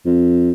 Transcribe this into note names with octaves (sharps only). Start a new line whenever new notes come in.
F2